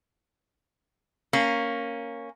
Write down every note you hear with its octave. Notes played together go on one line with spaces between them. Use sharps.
A#3 C#4